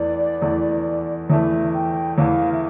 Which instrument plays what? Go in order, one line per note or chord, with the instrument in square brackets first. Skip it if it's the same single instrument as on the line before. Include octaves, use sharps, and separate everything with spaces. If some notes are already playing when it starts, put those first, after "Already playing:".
Already playing: [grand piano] E2 E3 A3 [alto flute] D5
[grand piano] E2 E3 A3
[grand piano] E2 E3 A3 [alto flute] E5
[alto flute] G5
[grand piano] E2 E3 A3 [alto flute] F5
[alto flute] E5